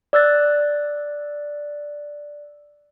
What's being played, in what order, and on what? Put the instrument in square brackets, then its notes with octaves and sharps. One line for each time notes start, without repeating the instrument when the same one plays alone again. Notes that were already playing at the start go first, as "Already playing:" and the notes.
[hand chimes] D5 E6 F#6 A6